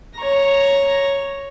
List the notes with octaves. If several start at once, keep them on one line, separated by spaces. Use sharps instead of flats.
C#5 A#5